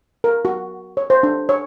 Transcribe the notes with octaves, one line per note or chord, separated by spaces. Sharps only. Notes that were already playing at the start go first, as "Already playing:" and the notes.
A#4
F#4
C#5
C5
D4
C#5